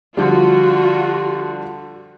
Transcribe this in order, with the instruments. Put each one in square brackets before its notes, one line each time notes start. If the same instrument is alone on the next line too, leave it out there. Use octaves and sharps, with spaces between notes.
[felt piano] D3 F3 G3 [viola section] F4 F#4